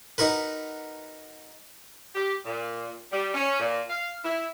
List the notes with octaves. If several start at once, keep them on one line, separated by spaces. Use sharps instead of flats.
D#4 F#4 A#4 B4
G4
A#2
G3
C#4
A#2
F5
E4